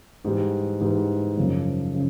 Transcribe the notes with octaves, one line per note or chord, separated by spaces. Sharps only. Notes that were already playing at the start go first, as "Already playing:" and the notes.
G#2 E3 G3
G#2 E3 G3
F#2 C#3 F3
C#3